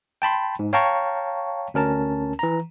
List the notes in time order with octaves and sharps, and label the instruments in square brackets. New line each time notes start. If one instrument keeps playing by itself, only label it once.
[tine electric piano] G5 A5 B5 C6
G#2
C#5 F5 G5 A5 A#5 C#6
D2 C#4 A#4 A5
E3 A#5